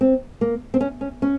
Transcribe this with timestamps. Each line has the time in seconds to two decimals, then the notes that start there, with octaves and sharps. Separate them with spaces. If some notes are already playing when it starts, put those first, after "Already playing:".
0.01 C4
0.41 A#3
0.74 C4
0.81 C#4
1.01 C#4
1.22 C#4